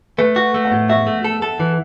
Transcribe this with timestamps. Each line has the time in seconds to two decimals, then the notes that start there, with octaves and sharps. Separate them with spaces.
0.18 A3 B4
0.36 F#4
0.54 A3
0.65 F#5
0.72 A2
0.89 F#4 E5
1.07 A3
1.24 A4
1.42 A4
1.60 E3